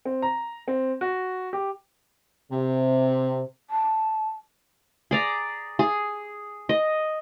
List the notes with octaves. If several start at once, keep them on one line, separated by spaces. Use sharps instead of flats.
C4
A#5
C4
F#4
G4
C3
A5
G#4 D5 A#5
G#4
D#5